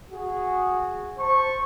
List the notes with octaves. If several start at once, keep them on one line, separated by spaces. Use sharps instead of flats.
F#4 G#4
C5 A5 C#6